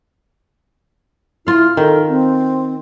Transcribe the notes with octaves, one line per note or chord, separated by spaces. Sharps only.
E4 F4 F5
D#3 A4
C4